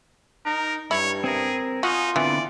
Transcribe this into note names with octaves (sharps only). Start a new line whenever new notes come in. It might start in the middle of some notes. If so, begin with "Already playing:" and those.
D#4 A#4
G2 E4 C#5
C4 G#4 A#4
D#4 F4 F#4 G#5 D#6
D3 E3 B3 C4 D5